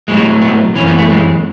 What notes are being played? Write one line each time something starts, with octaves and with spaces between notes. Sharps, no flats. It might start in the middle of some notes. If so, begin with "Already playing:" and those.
A2 F#3 G#3
B3
F#2 E3 C#4
B3
A3
G#3